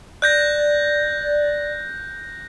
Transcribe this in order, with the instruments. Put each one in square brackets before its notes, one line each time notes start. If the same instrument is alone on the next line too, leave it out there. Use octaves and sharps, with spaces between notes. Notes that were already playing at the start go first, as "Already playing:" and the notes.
[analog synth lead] D5 [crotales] F#6 G6 A#6